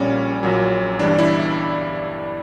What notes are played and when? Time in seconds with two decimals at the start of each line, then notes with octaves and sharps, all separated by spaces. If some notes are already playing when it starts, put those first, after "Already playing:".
Already playing: A#1 A#2 G3 C#4
0.43 A#1 A#2 F#3
0.99 G1 G2 E3 G3 D4
1.19 E4